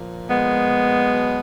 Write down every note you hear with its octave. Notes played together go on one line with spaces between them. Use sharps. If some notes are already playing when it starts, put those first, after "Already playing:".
Already playing: A#2 F3
G#3 B3
B2 F#3